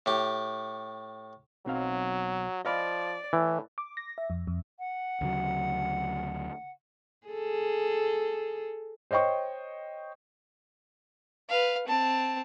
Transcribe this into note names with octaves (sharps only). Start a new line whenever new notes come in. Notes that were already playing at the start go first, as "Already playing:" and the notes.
A2 G4
B1 F#3 C4 F5
F3 D5 D#5 F5 B5
A2 E3
D6
A#6
E5
F2
F2
F#5
D2 C#3 F#3
G#4 A4
C5 C#5 D#5 G5 C#6
B4 F5
C4 A5